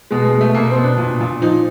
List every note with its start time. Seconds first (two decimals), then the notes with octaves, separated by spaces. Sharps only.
0.11 B2 G#3
0.25 G#3
0.33 B2
0.41 A3
0.54 B2 A#3
0.70 C4
0.76 B2
0.84 D4
0.98 A#2
1.21 A#2
1.42 F3 D#4